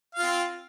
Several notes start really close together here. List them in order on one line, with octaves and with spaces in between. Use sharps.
F5 F4 C4